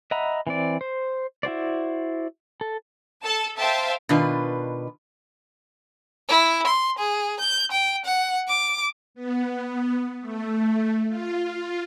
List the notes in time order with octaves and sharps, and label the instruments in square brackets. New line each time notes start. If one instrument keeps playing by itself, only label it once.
[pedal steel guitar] D#5 E5 F#5 A#5 B5
E3 C4 D5
C5
E4 F#4 C5 D5
A4
[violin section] A4 A5
C5 E5 F5 G5 A5
[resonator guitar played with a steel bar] B2 D#3 D4 F4 B4
[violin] E4
C6
G#4
G6
G5
F#5
D6
[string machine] B3
A3
F4